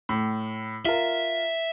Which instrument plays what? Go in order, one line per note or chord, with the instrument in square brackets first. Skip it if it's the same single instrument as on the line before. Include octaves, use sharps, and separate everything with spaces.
[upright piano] A2
[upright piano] F4 A#4 [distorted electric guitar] E5